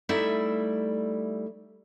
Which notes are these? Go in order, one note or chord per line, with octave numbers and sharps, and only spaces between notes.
G3 A3 D#4 E4 D5 E5